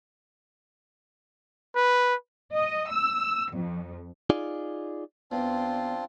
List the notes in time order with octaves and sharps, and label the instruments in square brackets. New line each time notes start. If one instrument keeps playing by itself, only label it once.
[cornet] B4
[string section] D#5
E6
F2
[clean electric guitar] D#4 F4 G#4 D5
[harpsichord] E2 [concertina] C4 D4 F4